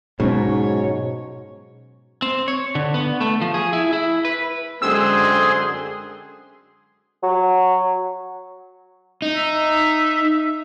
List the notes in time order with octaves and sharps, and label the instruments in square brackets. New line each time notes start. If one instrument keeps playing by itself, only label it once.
[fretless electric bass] G#2 [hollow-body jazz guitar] B2 [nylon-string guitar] F#3 C#4 [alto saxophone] C#5
[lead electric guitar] C4
C#5
D3
B3
A3
F3
G#4
E4
E4
B4
[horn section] F#2 C4 C6 [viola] D3 G#3 [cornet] G#4 [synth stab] E6
[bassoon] F#3
[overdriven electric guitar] D#4
[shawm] E5